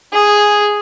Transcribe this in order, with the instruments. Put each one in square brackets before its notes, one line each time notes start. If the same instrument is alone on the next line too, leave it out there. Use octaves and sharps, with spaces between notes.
[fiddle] G#4